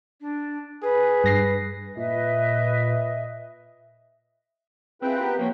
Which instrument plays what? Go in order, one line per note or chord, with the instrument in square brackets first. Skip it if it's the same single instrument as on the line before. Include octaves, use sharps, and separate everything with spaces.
[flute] D4
[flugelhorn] G#4 [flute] B4
[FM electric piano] G2 A#6 C7
[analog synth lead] A#2 [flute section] B4 D#5 E5
[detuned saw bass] C4 [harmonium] E4 F4 G#4 [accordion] B4 G5
[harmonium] B3 G4 A#4
[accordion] F3 [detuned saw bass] A#3 [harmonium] C#5 G5